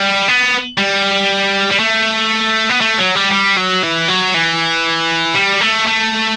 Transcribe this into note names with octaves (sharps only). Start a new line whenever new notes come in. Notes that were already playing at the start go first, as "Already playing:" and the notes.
Already playing: G3
B3
G3
G3
A3
B3
A3
F#3
G3
G3
F#3
E3
F#3
E3
G3
A3
A3